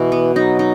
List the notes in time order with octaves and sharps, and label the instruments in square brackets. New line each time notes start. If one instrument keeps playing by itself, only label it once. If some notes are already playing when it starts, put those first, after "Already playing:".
Already playing: [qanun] B2 [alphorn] E3
[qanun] B3
[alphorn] F#3 [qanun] D#4
[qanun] D#4